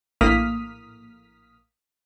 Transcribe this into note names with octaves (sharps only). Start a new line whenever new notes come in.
A#1 A2 A#3 D#6 F6 B6